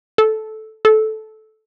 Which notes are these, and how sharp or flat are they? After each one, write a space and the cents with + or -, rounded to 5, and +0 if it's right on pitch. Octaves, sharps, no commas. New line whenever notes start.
A4 -10
A4 -15